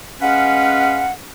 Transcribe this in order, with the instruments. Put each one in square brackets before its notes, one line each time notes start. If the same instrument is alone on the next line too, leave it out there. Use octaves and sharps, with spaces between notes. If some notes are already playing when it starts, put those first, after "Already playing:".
[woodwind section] G#3 C#4 B4 F5 F#5